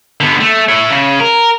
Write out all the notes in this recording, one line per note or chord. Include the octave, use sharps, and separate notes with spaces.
D3 B3
A3
E4 C#5
C#3
A#4